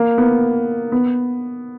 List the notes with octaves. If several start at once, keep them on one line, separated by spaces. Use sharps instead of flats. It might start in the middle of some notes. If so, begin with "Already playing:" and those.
Already playing: A#3
B3
B3